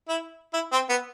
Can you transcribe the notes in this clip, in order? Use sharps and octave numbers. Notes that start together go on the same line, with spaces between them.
E4
E4
C4
B3